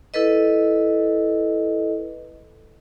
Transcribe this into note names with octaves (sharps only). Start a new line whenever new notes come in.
E4 A4 B4 D#5